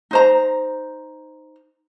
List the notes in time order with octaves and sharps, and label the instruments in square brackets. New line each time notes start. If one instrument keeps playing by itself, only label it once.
[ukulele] D#4 C5 A#5